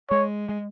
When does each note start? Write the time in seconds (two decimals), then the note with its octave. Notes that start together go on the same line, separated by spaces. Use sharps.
0.10 G#3 C#5
0.49 G#3